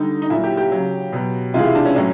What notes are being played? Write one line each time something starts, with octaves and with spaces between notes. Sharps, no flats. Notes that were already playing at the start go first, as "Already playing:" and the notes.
Already playing: D3 G3 D#4
D#4
A#2 F#3 E4
G4
G4
C#3 F#3
B2 F#3
C3 E3 G#3 F4
E4
D4
C#4
A2 F#3 C#4